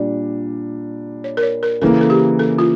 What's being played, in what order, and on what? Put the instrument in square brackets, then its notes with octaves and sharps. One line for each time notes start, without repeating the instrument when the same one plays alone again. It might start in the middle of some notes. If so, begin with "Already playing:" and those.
Already playing: [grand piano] A#2 G3 D4 [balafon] D5
[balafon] C#5
A#4
C#5
A#4
[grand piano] C#3 E3 A#3 [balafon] A4
[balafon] A4
G4
A4
F4